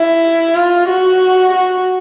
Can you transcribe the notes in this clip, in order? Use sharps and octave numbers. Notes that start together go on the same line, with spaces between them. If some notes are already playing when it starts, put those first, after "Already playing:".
Already playing: E4
F4
F#4
F#4